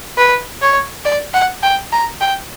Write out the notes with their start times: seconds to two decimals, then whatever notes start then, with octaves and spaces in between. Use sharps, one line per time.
0.18 B4
0.62 C#5
1.05 D5
1.34 F#5
1.63 G5
1.92 A#5
2.21 G5